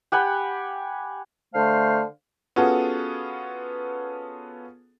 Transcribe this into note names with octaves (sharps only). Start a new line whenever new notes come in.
G4 F#5 G#5 B5
D3 A3 C5 F5 A5
B3 C#4 F4 F#4 G#4 A4